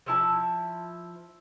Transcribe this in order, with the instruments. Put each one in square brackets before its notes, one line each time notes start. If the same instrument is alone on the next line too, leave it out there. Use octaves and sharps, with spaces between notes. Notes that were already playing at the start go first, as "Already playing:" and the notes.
[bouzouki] F3 E4 A5